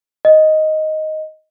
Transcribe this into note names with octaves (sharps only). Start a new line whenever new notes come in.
D#5